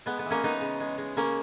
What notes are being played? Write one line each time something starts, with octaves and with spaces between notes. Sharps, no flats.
G#3 B3
B3
E3
A#3 C#4
G#3 B3 D#4
C#3
G#3
G#3
C#3 A#3 C#4